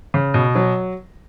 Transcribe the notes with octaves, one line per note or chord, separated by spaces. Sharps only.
C#3
B2
F#3